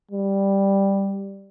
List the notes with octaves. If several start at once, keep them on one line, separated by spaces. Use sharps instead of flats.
G3